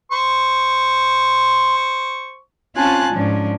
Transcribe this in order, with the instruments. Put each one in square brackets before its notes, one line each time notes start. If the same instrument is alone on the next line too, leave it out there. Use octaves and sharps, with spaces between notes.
[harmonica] C5 C#6
[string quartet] C4 C#4 F4 G#5 A5 F#6
G#2 F3 C#4 D4